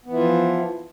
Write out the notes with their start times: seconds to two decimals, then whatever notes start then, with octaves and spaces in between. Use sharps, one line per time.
0.05 B3
0.09 E3
0.12 E4
0.16 F4
0.20 F3